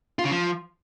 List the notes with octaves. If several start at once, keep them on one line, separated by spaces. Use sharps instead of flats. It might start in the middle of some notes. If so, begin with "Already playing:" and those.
F4
C#3
F3